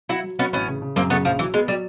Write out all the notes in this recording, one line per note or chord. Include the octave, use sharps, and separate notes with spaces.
F#3 E4 F#4
F#3
F#3 B3 C#4
A1 B3 C#4
C#3
C#3
F#2 A#3 C4
C#3 A3 B3
A#1 F3
E3 F#3
G#3 B3
F#3 G3